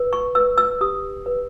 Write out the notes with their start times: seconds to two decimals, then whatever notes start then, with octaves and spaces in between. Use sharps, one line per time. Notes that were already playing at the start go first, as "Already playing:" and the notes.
Already playing: B4
0.13 C#6
0.35 B4 E6
0.58 E6
0.81 G4 D#6
1.26 B4